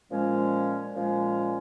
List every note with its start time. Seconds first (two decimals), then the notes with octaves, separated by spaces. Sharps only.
0.11 A#2 F3 G#3 C#4
0.95 A#2 F3 G#3 C#4